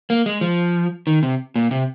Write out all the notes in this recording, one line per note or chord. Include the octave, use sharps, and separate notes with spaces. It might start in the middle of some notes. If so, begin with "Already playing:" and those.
A#3
G#3
F3
D#3
C3
A#2
C3